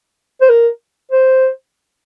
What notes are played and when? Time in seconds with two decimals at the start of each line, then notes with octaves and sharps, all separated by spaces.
0.41 C5
0.49 A#4
1.11 C5